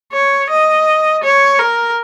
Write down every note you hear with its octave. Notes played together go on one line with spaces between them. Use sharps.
C#5
D#5
C#5
A#4